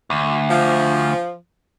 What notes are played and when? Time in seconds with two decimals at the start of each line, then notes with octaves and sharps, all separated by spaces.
0.10 D2
0.50 F3